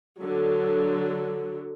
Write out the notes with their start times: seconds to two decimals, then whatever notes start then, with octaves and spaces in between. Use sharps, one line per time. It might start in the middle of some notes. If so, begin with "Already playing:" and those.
0.19 D3 F#3